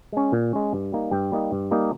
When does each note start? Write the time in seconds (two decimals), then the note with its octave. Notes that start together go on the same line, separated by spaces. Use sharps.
0.12 G#3 C#4
0.32 A#2
0.53 G#3 C#4
0.73 G2
0.92 G3 A#3 D#4
1.11 G2 G5
1.32 G3 A#3 D#4
1.52 G2
1.71 G3 A#3 D#4